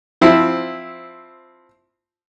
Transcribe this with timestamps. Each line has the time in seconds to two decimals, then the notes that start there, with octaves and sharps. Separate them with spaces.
0.21 F3 C4 E4